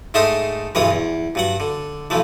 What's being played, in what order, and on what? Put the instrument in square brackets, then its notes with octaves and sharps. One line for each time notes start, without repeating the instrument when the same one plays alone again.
[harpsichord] G#2 A3 D#4 E5 C6 D#6
B1 G2 E3 G#3 C#5 D#6
E2
G2 F#3 F#5
D3
B1 E3 F3 A3